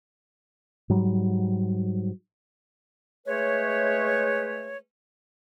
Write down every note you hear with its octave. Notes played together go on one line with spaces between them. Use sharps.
G#2 F#3 G3
G#3 A3 B4 C#5